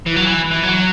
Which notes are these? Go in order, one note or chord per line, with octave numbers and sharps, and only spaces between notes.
E3
F#3
E3
E3
F#3